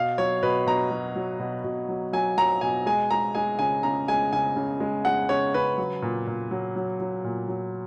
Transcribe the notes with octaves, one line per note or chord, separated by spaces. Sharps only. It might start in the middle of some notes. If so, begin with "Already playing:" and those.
Already playing: B2 F5
F#3 C#5
B2 B4
B2 A#5
F#3
F#3
B2
B2
F#3
F#3 G#5
F#3 A#5
B2 G#5
G#3 G#5
G#3 A#5
G#3 G#5
C#3 G#5
C#3 A#5
G#3 G#5
C#3 G#5
C#3
G#3
G#3 F#5
C#3 C#5
C#3 B4
F#3
A#2
A#2
F#3
F#3
F#3
A#2
F#3